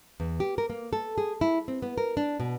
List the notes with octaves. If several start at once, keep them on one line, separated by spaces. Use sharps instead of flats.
E2
G4
A#4
A#3
A4
G#4
E4
C4
B3
A#4
D4
B2